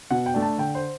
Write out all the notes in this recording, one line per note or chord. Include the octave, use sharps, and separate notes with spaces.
B2 F#5
G5
A3 D4
A5
D3 G5
C5